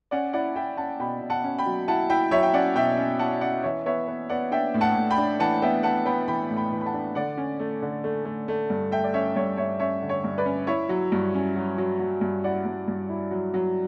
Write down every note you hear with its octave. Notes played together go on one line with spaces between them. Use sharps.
C#4 D5 F#5
E4 D5 F#5
E4 E5 G5
C#4 F#5 A5
B2 G5 B5
B2
F#5 A5
C#4
G5 B5
F#3
E4 F#5 A5
E4 E5 G5
F#3 C#5 E5
G5
C#4 D5 F#5
B2 E5 G5
C#4
E4 F#5 A5
C#4 D5 F#5
E3 C#5 E5
B3 C#5 E5
B3
B3 D5 F#5
D4 E5 G5
A2
F#5 A5
A2
G5 B5
D4
E3 F#5 A5
B3 E5 G5
B3 F#5 A5
B3 G5 B5
E3 G5 B5
A2
G5 B5
E3
B5
F#5 A5
D4
D3 D5 F#5
C#4
A3
D3
A3
A3
A3
G2
A3 E5 G5
D5
C#4 C#5 E5
G2 C#5
G2 C#5 E5
C#4 C#5 E5
D3
C#5
G2
B4 D5
C#4
E4 C#5 E5
F#3
G2
C#4
F#3
F#3
F#3
G2
E4 D5 F#5
G2
G2
E4
F#3
F#3